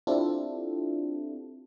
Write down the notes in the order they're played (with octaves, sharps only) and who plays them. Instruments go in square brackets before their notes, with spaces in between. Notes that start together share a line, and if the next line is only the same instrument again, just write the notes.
[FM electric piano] C4 D4 E4 F4 G4 A4